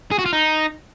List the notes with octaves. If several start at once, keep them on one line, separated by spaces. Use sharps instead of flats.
G#4
F#4
F4
D#4